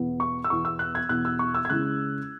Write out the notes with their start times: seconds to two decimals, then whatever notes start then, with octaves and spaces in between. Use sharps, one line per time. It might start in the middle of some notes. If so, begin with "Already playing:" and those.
Already playing: E2 B2 B3 E4
0.20 C#6
0.44 E6
0.50 E2 B2 B3 E4 C#6
0.65 E6
0.79 F#6
0.95 G#6
1.09 E2 B2 B3 E4 F#6
1.25 E6
1.39 C#6
1.55 E6
1.65 G#6
1.69 C#3 G#3 C#4 E4 F#6